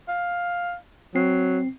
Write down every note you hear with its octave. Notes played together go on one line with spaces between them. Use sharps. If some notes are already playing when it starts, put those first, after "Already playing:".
F5
F#3 C4 C7